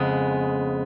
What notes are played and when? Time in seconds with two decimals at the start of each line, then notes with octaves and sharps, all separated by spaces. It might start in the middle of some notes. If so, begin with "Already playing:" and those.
Already playing: F2 C#3 G#3 B3